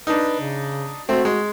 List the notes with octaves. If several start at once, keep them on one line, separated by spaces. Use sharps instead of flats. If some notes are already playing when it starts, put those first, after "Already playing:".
D4 D#4 B4
C#3
A3 C4 F#4
G#3